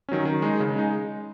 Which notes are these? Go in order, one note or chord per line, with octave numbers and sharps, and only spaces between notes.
D#3 F#3 C#4
D#3
G#3 D#4
C#3
G#3 D#4